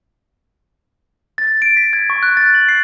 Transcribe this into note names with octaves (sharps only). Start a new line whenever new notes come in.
A6
D7
B6
G#6
C#6
F#6
A6
F#7
C7